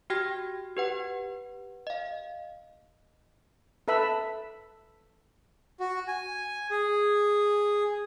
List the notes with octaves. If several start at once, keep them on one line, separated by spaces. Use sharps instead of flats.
F#4 G4 G5 F6 G#6 A#6
G4 B4 F#5
D#5 F5
A4 B4 E5 B5
F#4
G#5
G#4